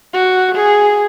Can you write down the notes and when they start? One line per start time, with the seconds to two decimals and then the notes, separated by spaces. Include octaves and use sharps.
0.13 F#4
0.55 G#4